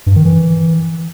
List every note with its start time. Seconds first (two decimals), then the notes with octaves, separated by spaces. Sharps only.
0.06 G2
0.16 D#3
0.25 E3